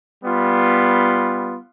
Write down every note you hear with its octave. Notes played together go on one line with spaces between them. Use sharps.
G3 B3 F4